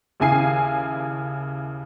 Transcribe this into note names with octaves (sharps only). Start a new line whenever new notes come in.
D#2 C#3 E4 G#5 C7